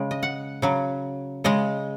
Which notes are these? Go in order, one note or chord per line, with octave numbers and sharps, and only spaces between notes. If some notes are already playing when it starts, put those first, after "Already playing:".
Already playing: C#3 G#3
D#5
F#5
C#3 F#3
C#3 G#3 D#5